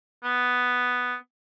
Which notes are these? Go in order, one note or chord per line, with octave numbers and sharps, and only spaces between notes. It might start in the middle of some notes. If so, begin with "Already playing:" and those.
B3